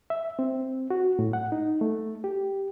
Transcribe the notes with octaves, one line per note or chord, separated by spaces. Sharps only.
E5
C4
F#4
A2
F#5
D#4
A3
G4